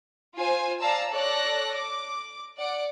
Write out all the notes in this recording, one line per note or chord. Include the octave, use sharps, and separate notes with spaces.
F4 C5 G#5
D5 F5 A5 A#5 E6
A4 C#5 D5 F#6 A#6
D6
D5 F#5 D7